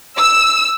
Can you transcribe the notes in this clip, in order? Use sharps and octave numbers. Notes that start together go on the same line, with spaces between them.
E6